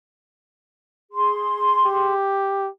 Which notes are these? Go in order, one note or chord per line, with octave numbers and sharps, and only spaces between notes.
G#4 C6
G4